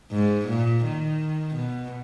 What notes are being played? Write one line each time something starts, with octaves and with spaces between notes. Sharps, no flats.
G#2
A#2
D#3
B2